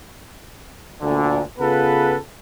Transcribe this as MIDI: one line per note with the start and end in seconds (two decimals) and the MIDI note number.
1.01 1.41 38
1.01 1.41 46
1.01 1.41 50
1.59 2.17 49
1.59 2.17 59
1.59 2.17 65
1.59 2.17 68
1.59 2.17 69
1.59 2.17 71